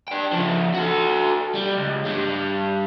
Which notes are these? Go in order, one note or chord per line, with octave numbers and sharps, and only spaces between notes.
D4 G5
C#3 F3
F#4 A4
G3
C#2
G2 G3